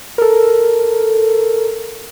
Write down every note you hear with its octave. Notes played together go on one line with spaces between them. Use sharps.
A4 A#4